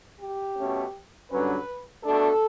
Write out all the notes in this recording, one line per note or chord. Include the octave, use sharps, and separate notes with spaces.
G4
B2 A3 C#4
G2 D3 F#3 C#4 B4
B2 A3 D4 A4